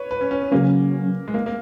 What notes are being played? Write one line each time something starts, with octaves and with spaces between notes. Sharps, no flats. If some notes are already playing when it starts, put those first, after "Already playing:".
Already playing: B4 C#5
B4
C#4
C#4
B3
C#3 F#3 A#3 C#4
G#3
A#3
A#3